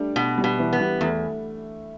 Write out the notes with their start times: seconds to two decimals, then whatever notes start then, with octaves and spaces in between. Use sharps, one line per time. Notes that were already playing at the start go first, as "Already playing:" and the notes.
Already playing: G3 A3 D4
0.16 B2
0.38 G3
0.44 B2
0.59 E3
0.73 B3
0.80 G3
1.01 E2 A3